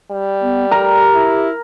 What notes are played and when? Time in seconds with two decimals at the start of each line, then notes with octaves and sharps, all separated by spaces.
0.11 G3
0.42 B3
0.71 G4 A#4
1.15 E4